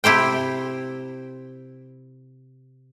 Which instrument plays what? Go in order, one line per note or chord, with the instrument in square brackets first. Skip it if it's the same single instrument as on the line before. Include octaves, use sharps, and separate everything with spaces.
[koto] C3 E4 G4 C5 G5